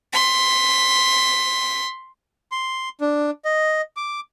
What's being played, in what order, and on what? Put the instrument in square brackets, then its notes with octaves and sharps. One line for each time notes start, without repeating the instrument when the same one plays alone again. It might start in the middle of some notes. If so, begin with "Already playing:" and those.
[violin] C6 B6
[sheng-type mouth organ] C6
D4
D#5
D6